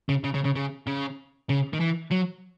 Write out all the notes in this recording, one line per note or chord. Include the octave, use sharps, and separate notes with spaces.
C#3
C#3
C#3
C#3
C#3
C#3
C#3
D#3
E3
F#3